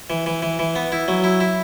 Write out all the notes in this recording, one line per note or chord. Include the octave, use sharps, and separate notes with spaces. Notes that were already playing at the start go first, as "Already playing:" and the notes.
E3
E3
E3
E3
B3
E4
F#3
E4
E4